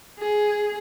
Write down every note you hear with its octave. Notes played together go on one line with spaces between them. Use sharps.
G#4